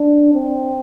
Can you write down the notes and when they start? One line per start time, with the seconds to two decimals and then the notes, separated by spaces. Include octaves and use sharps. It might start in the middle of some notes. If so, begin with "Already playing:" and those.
Already playing: D4
0.34 C4